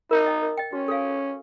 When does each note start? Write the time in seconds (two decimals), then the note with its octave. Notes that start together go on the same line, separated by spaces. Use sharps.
0.11 D#4 A#4
0.26 D#5 G5
0.42 A#4
0.57 D#5 G5
0.73 C#4 F#4
0.88 A4 C#5 F5 G#5